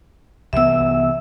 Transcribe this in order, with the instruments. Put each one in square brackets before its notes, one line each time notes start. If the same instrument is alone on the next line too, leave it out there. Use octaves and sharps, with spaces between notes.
[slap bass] C2 E3 B3 [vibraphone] E5 E6